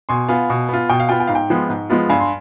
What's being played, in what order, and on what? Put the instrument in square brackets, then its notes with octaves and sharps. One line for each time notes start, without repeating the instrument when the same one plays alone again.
[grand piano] B2 G#5 C6
B3 F4 F5 G#5
B2
B3 F4
B2 G5
F5
B3 F4 G5
G5
G#2 F5
G5
F3 G#3 B3 F4
G#2
F3 G#3 B3 F4
G2 F5 G#5
C6